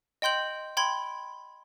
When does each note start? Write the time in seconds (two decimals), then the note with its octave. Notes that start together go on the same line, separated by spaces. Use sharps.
0.22 D#5 G5 C6 G6 F#7
0.77 G5 B5 C6 G#6